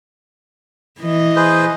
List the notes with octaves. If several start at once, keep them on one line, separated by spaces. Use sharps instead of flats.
E3 D#5
G#4 B4 C5